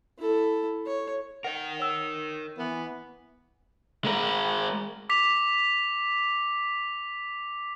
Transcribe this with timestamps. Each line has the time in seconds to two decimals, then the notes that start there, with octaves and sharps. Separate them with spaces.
0.19 E4 A4
0.86 C#5
1.44 A#4 D#5 F#5
1.80 C#5 E6 E7
2.59 E3 B3
4.05 G#3 A#4
5.09 D6 B6 F7